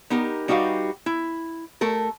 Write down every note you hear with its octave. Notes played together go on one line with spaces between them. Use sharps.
B3 D#4 G4 A#4
G3 D#4 F#4 G4 B4 F5
E4
A3 A4 A#4